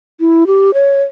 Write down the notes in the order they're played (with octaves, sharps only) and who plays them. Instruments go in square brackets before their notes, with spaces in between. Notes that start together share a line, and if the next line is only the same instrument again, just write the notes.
[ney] E4
G4
C#5